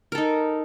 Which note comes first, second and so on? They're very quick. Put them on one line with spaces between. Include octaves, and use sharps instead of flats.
A#4 A4 D#4